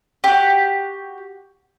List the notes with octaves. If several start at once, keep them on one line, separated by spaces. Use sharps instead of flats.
F#4 G4